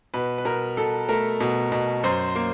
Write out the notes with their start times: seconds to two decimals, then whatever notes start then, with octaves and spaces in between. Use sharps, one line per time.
0.14 B2 B4
0.38 B4
0.45 B2 A#4
0.77 B2 A4
1.09 A3 A#4
1.40 B2
1.72 B2
2.03 F#2 C5
2.36 A#3